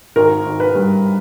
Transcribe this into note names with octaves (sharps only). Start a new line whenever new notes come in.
G#1 A#4
G#1
B4
G2